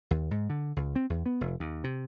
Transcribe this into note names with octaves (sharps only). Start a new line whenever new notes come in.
D#2
G#2
D3
C#2
C4
E2
B3
F1
D#2
C3